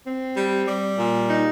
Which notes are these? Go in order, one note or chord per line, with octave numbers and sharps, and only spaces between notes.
C4
G3
G3
A#2
D#4